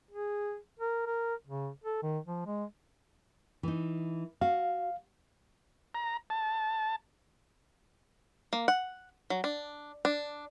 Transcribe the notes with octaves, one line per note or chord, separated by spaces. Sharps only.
G#4
A#4
A#4
C#3
A4
D#3
F3
G#3
E3 D#4
F#4 F5
A#5
A5
A#3
F#5
F#3
D4
D4